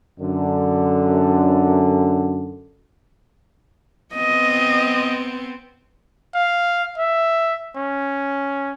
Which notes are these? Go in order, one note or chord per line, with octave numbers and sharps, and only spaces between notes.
F#2 D3
B3 C4 D#5
F5
E5
C#4